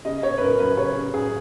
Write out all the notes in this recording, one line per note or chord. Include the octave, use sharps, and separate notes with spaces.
C#3 D#5
C#3 C#5
B4
F#2 A#4
F#2 B4
C#3 C#5
C#3
F#2 G#4